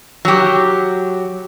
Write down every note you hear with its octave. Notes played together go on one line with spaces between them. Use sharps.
F#3 G4